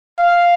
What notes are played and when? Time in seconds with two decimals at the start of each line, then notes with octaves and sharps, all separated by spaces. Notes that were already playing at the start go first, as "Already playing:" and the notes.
0.19 F5